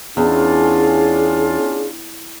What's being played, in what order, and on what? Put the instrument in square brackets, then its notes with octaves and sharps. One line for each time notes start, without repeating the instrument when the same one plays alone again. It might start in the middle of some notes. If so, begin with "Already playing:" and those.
[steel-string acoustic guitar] E2 [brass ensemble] C#4 D4 F4 [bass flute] G#4